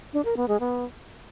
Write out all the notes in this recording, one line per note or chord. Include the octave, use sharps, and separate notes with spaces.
D4
A#4
B3
G#3
B3